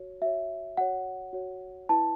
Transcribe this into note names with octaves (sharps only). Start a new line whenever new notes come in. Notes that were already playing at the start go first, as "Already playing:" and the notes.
Already playing: F#4 C#5
F#4 C#5 E5
F#4 C#5 F#5
F#4 C#5
E4 B4 A5